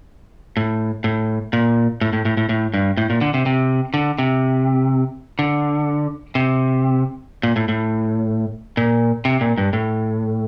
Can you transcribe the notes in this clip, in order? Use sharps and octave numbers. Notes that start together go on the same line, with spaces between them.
A2
A2
A#2
A2
A2
A2
A2
A2
G2
A2
A#2
D3
C3
C3
D3
C3
D3
C3
A#2
A2
A2
A#2
C3
A#2
G2
A2